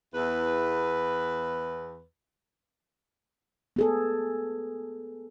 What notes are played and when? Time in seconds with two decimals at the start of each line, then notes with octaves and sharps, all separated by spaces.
0.14 E2 B4
3.76 B3 G#4 A4